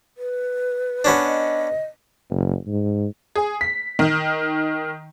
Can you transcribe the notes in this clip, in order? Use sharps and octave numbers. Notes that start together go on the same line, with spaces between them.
B4
B3 C#4 D4
D#5
F#1
G#2
G#4
B6
D#3